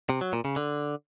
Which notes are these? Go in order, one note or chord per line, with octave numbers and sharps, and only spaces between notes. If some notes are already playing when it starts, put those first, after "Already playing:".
C3
F#3
A#2
C#3
D3